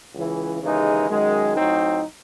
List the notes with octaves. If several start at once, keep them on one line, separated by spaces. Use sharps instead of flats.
C#2 C#3 E3
D#2 C#3 E3 G#3 D#4
F#2 D#3 G#3
A2 F#3 C4 D#4